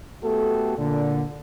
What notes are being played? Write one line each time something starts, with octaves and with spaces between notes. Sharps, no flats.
A3 B3 F#4 G4 A4
A#2 D3